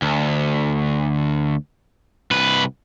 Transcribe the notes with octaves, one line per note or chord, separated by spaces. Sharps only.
D2
C2 B4